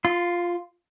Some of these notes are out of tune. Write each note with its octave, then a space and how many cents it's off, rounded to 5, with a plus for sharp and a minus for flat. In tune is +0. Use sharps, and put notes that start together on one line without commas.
F4 +0 C6 -25